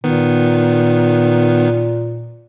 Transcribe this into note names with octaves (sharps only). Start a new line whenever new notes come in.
A#2 D#3 B3